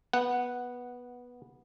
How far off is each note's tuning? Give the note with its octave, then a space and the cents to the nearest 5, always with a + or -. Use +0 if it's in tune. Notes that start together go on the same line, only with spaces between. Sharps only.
B3 -10 F#5 +0